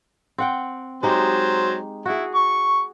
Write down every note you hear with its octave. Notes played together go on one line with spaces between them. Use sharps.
C4 F#5 G5
F#3 G#3 D#4 G4 C5
E4 F#4 G#4
C#6